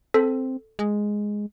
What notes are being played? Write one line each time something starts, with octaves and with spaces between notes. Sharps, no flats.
C4 A4
G#3